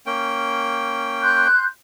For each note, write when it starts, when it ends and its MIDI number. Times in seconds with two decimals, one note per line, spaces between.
0.06 1.48 58
0.06 1.48 61
0.06 1.48 79
1.21 1.65 84
1.21 1.65 90
1.21 1.65 91